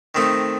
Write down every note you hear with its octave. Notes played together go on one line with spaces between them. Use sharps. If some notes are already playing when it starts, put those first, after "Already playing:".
D#3 A3 C4 D#4